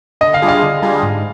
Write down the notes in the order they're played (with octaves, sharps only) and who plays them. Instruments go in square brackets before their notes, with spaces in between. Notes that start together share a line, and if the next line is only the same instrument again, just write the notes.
[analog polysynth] D3 [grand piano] D#5
[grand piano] F5
[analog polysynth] G3 D4 F4 G#4
[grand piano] F5
[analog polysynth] D3
G3 D4 F4 G#4
G#2